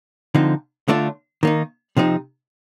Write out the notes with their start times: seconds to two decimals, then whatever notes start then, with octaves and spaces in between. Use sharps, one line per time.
0.35 D3 F3 C4 D#4
0.88 D3 A3 D4 F4
1.43 D#3 A#3 D#4
1.97 C3 F3 C4 D#4